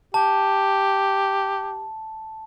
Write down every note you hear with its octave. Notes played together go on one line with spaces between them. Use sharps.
G4 A5